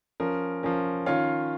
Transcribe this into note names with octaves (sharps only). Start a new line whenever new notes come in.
F3 C#4 A#4
F3 C#4 A#4
D#3 C#4 F4 C#5 F5